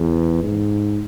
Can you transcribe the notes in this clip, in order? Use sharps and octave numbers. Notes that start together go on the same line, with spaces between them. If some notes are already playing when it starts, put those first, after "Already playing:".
Already playing: E2
G#2